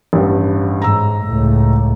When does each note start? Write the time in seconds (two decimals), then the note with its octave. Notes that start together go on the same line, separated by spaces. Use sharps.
0.13 A1 G2
0.82 G#2 A#5 E6
1.24 C#2 A2